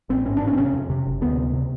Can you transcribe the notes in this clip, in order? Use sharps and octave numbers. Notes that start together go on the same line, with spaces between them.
A1 C4
G#2 C#4
A1 D4
C#4
C4
C3 C#4
F2
C3
F#1
D2 B3
C3
C3